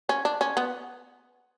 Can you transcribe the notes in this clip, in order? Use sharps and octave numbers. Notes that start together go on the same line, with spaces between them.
C#4
D4
C#4
B3